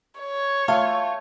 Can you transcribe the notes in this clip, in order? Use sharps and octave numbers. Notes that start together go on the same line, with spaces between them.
C#5
A3 F4 F5